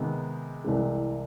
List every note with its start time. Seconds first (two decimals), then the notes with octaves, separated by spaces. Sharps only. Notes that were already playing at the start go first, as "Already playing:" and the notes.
Already playing: C3 D#3 G#3 B3
0.64 C2 C3 E3 G#3